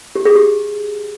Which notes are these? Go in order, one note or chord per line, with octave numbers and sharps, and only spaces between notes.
G4
G#4
G4